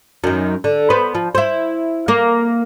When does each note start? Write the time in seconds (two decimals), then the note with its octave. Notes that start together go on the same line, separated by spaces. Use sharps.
0.24 F#2 D#3
0.64 D3
0.90 B3 B4 C5
1.15 F3
1.35 E4 C5
2.08 A#3 A#4